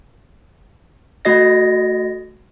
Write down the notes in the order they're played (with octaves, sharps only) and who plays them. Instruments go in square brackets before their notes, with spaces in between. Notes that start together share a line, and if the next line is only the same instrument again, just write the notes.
[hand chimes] A3 F#4 D#5 A#6